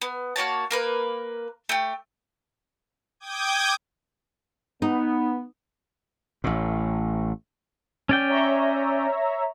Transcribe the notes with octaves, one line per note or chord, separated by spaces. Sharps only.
B3
A#3 F#4 C#5 A5
A#3 A#4 B4
A3 G4
G5 D6 D#6 G6 G#6
B3 D#4
A1 A2
C#4 D5 G5
C#5 E5 A#5